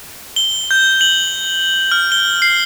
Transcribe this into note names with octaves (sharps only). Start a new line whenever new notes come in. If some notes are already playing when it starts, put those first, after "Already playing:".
G7
G6
F#7
F6
G7
C7